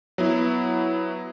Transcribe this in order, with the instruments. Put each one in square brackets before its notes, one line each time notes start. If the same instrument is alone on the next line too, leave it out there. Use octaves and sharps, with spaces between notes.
[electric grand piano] F#3 B3 E4